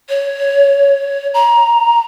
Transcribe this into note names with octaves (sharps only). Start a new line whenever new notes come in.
C#5
A#5